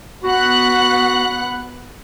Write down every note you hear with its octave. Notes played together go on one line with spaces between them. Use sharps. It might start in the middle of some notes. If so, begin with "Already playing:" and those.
B3 F#4 F#5 B5 F#6